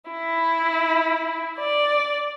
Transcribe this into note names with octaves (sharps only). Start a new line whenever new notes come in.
E4
D5